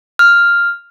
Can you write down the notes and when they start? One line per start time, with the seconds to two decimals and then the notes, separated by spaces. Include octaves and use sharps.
0.19 F6